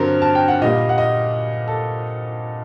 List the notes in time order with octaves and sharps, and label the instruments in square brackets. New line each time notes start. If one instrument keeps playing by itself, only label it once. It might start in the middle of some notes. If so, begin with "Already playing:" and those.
Already playing: [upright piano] G2 D3 F#3 C4 A#4 C5
A5
G5
F#5
A#2 G3 A#3 D#5
F#5
D#5
A4